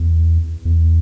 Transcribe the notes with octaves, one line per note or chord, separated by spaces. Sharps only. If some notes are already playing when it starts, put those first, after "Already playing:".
Already playing: E2
E2